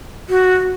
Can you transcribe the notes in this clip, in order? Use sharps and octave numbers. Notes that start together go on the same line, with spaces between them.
F#4